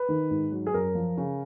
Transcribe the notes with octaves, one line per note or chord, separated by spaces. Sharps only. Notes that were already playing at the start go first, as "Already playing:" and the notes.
Already playing: B4
D#3
G#2
F#3
G#4
F#2 A#4
F3
C#3